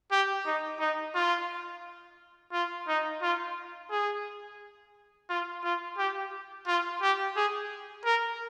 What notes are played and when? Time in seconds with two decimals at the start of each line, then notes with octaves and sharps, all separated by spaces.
0.12 G4
0.45 D#4
0.80 D#4
1.14 F4
2.53 F4
2.88 D#4
3.22 F4
3.91 G#4
5.29 F4
5.64 F4
5.98 G4
6.67 F4
7.02 G4
7.36 G#4
8.05 A#4